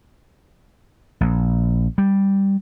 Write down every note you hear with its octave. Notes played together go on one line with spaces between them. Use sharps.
A#1
G3